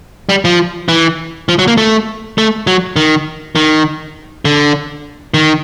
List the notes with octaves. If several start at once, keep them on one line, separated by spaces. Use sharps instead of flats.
G3
F3
E3
F3
F#3
A#3
A3
A3
F#3
D#3
D#3
D3
D#3